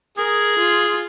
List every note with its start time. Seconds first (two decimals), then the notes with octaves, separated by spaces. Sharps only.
0.18 G#4 A#4
0.59 F4